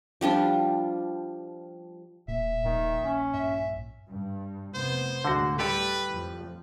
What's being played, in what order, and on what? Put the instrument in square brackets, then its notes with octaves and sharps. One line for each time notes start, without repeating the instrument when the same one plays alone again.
[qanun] F3 G3 D4 F4
[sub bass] D#1 [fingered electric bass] A#2 [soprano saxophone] E5
[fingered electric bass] A#1 A#2 [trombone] D#3
[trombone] C#4
[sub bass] G2 [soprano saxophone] E5
[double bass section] G2
[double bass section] F1 C3 B3 [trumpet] C5
[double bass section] D2 A2 G#3 [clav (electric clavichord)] D3 F#4
[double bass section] G3 [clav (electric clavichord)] G4 A4 D5 [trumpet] B4
[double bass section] F2 F3